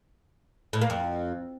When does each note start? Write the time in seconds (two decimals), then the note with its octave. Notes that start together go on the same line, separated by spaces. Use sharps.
0.73 A2
0.82 A#3
0.90 F2